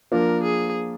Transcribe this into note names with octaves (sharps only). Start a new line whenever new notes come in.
F3 A#3 D4 A#4
G#4